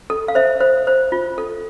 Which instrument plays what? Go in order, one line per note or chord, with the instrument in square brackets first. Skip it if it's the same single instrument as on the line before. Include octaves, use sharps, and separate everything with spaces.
[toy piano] A4
F5
C5 E5
C5
C5
F4
A4